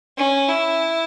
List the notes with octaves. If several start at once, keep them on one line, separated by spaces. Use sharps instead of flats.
C#4
E4